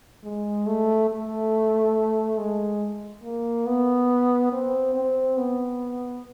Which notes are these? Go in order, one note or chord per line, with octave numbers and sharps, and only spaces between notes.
G#3
A3
A3
G#3
A#3
B3
C4
C4
B3